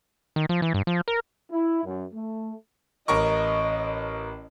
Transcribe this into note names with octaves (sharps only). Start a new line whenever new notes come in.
D#3
F3
E3
G2
F3
A#4
E4
F#2
A3
A1 A#4 D#5 C#6